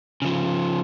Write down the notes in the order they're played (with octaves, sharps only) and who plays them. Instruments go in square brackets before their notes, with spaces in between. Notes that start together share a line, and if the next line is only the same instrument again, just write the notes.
[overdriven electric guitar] C#3 F3